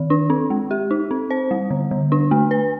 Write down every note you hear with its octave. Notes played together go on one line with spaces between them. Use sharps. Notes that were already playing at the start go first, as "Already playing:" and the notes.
Already playing: D#3
D4
C4
G#3
G4
D#4
C4
C5
G3
D3
D3
D4
A3
B4